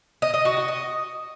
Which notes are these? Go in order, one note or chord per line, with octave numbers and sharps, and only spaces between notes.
D#5
D#5
F#4
F#4
D#5